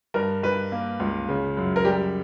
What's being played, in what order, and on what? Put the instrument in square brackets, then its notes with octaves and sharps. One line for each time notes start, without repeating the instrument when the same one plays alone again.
[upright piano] G2 A#4
G2 B4
A#3
C#2
C#3
F#2
A#4
G3 G4